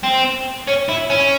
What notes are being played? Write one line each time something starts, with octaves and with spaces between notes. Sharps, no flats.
C4
C#4
E4
C#4